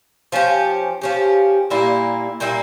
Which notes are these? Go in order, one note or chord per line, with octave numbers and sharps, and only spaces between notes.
F3 C#4 G4
F3 C#4 G4
A#2 G3 A#3 E4
A#2 G3 A#3 E4